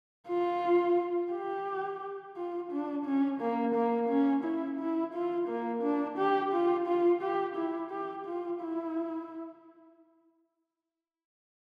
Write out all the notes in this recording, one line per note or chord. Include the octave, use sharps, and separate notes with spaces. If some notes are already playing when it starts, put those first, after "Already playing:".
F4
G4
F4
D4
C#4
A#3
A#3
C#4
E4
E4
F4
A#3
D4
G4
F4
F4
G4
E4
G4
F4
E4